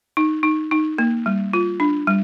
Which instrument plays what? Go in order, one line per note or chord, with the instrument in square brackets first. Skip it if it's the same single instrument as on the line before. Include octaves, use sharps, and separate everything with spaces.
[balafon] D#4
D#4
D#4
A#3
G3
F4
D4
G3